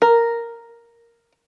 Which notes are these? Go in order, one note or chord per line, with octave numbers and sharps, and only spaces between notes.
A#4